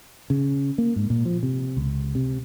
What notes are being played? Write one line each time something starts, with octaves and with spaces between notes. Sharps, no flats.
C#3
A#3
G#2
A#2
F3
C3
C#2
C3